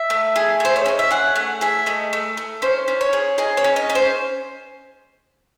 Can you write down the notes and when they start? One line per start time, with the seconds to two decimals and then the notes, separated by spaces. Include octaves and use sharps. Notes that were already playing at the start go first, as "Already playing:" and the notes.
Already playing: E5
0.10 A3
0.36 G#4
0.60 A3 C5
0.76 C#5
0.86 C#4 D#5
0.99 E5
1.11 G#4 F#5
1.36 A3 F#5
1.61 G#4 E5
1.86 A3 D#5
2.13 A3
2.37 A3
2.62 C#4 C5
2.88 C#4
3.01 C#5
3.13 G#4
3.38 G#4 D#5
3.57 C#5
3.64 C#4
3.76 D#5
3.90 C#4
3.95 C5